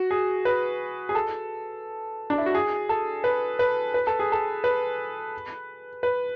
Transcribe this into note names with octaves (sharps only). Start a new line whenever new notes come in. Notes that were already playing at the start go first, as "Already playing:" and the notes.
Already playing: F#4
G#4
B4
G#4
A4
D4
E4
F#4
G#4
A4
B4
B4
B4
A4
G#4
A4
B4
B4